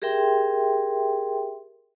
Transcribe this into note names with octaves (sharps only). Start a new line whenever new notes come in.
G4 G#4 A#4 E5 G5 C6